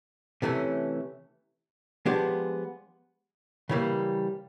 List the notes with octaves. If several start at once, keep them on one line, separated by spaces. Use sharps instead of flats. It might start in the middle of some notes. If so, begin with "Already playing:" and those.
C3 E3 A3 C#4
F3 G#3 B3 D4 G4
C#3 E3 G3 A#3